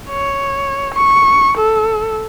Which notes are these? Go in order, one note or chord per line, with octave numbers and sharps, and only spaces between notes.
C#5
C#6
A4